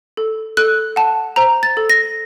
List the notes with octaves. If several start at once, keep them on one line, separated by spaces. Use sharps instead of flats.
A4
A4 F#6
F#5 A5
C5 A#5
A6
A4
A#6